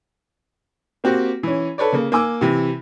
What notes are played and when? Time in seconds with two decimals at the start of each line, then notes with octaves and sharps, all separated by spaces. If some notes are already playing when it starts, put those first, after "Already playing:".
1.04 A#3 C4 F#4 G4
1.43 E3 C#4
1.78 A4 B4 C#5 D5
1.93 C#3 A#3
2.12 A#3 G#5 D6 E6
2.41 C3 E3